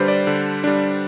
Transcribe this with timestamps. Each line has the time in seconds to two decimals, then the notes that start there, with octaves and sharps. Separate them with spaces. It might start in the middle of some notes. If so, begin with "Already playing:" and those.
Already playing: D3 G3 D4 B4 C5
0.08 D5
0.27 D3
0.64 G3 D4